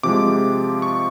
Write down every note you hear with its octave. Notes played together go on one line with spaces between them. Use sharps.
C3 F3 G#3 D6
C#6